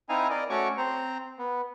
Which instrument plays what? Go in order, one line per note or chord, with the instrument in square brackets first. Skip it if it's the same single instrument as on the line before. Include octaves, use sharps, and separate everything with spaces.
[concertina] C4 D#4 E4 F5 G#5 A#5
A#4 D5 D#5
A3 C#4 F#4 C#5 C#6 D6
C4 C5 A#5
B3